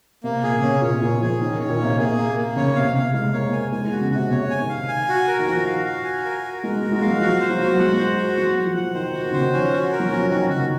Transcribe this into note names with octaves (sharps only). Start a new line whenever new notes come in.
C3 A#3
A#2 G#4
C#3
C3 C#4
A#2 C#5
C3
A#2 G#4
F3 G#4
D#3 C#4
D#3
C#5
A#2
C3 A#3
C3 G#4
A#3
A#3
C#3 C#5
C3 F5
C#3
F5
G#3 F5
A#3 C#5
A#3 G#5
G#3 G#5
G#3 F#4
C#3
C3 F#4
C3 C#5
G#5
D#3
F5
G#5
F#4
A#4
D#3
F3 F#4
F5
F#4
G#5
A#4
F#4
G#3 A#4
G#3
F#4
G#3
F5
F#3
F3 F#4
C5
F#3
F#4
F#3
G#3 F#5
C5
F#4
F#3 F#5
F#5
F3
F#5
D#3 C5
F#4
D#3
C#3 C5
D#3
F3 C#4
F#4
A#4
F#3
F3 C#4
D#3 F#4
C#3 F#4